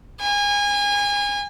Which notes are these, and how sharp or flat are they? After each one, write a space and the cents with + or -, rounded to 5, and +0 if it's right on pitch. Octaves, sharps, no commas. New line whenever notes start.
G#5 -30